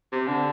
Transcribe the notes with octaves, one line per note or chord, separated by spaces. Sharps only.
C3
D3